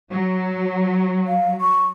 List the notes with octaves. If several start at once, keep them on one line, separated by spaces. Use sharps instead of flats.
F#3
F5
C#6